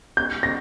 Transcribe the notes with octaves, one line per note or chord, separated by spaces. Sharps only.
G6
A#6